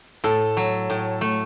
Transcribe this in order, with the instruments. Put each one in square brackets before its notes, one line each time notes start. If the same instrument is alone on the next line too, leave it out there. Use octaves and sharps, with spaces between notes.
[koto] A2 [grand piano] A4
[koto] F#3
A2
A3